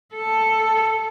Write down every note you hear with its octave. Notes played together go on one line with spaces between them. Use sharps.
A4